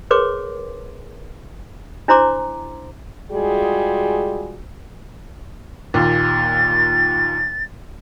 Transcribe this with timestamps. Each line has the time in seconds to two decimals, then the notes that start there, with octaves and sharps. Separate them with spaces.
0.11 G#4 A#4 B4 C#5 C6 D6
2.08 D4 E4 C5 A#5 C6 D6
3.31 G3 G#3 F4 F#4 G#4
5.94 D#2 A#2 A6